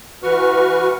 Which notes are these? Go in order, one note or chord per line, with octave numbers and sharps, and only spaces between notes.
E3 F#4 B4 C#6 F6